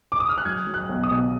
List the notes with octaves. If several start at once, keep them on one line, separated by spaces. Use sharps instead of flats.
D6
D#6
F6
F#6
F#3 G#6
F#3
F#6
B1
D#6
B2